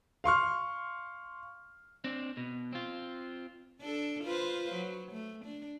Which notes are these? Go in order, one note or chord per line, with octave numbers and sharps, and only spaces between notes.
F5 C6 C#6 F6
C4 D4
B2
C4 F4
D4 A4
F4 B4 C5
F#3
A3
D4